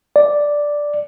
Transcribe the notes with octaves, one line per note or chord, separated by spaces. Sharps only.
D5